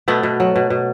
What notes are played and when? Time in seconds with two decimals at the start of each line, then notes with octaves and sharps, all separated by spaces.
0.08 B2 A3 B3
0.23 B2
0.40 F#3
0.56 B2
0.70 B2